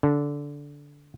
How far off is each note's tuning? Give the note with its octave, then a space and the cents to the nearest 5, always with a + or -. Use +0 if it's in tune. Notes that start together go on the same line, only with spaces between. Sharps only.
D3 -15